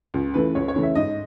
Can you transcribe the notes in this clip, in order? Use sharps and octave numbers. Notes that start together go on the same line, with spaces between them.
C#2
C#3 E3 A3 B4
C#2 C#5
C#5
C#3 E3 A3
E5
G#2 D#5